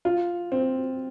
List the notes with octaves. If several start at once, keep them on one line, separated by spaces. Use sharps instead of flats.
F4
C4